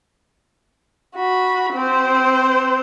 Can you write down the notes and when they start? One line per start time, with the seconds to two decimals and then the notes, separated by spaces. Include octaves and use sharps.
1.16 F#4 B5
1.74 C4 C5